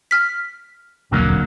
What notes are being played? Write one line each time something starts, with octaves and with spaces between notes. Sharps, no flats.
F6 B6
D#1 B1 F2 D3 F#3 A#3